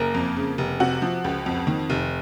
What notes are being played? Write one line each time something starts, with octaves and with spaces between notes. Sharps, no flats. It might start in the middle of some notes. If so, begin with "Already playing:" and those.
Already playing: F#1 A#3 A#4
F2
C#3
F1
C3 F#4
F3
C#2
F2
D#3
F1